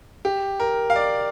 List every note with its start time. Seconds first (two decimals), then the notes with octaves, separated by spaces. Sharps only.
0.25 G4
0.60 A#4
0.90 F5
0.96 D5